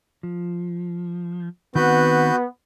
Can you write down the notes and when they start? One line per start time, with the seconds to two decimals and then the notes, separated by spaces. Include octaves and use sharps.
0.23 F3
1.75 D#3 B3 C4 F#4 B4 G6